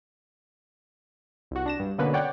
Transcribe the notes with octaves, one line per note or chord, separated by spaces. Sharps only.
C2 F#4
D4 A#6 E7
G2
B2 D3 A#3 B3 C#4 B4
C#5 D5 F#5 G5